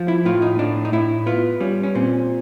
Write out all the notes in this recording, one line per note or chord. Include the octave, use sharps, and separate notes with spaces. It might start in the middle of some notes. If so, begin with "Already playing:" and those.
Already playing: F3
E4
A2 F4
D#4
A2 D4
D#4
A2 E4
B3 F4
G3 C#4
C#4
A#2 C4